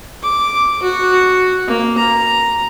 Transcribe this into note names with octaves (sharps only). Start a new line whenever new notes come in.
D6
F#4
A#3
A#5